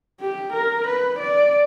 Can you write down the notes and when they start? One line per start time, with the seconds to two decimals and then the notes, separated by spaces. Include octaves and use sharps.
0.21 G4
0.53 A#4
0.87 B4
1.20 D5